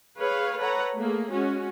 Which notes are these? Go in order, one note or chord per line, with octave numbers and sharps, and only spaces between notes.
G#4 B4 C#5 F5
A4 B4 C#5 F#5 A#5
A3 A#3 G#4
G#3 C#4 F#4